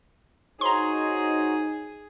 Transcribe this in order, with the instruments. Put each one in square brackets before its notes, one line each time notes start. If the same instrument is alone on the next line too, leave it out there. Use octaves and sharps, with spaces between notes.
[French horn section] D#4 [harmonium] F#4 C5 C#5 [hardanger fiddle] G#4 [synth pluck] A#5 C6